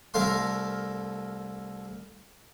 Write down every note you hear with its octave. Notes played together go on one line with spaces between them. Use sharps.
C2 A3 A#4 F5 C6